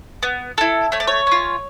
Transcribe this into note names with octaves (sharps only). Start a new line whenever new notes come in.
B3
E4 A4
A3 C#5
D5
C#5
C#4 F4